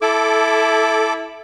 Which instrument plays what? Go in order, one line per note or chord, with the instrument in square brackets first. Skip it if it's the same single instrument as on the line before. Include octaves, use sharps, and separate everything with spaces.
[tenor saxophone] E4 [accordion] A4 D6